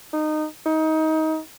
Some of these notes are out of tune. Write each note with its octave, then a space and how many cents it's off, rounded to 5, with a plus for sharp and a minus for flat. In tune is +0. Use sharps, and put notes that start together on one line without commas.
D#4 -20
D#4 +25